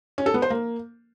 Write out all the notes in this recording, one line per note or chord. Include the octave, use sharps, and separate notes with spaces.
C#4
A4
B3
C5
A#3